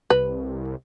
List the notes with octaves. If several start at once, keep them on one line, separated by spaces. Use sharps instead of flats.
C2 B4